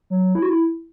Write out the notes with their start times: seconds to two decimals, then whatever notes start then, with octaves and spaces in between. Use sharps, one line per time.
0.10 F#3
0.35 E4
0.42 F#4
0.49 E4